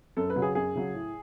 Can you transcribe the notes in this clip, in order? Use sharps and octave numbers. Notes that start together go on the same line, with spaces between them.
F#2 A4
B4
C#3 F#3
G#4
F#2 G#4
C#3 F#3
A2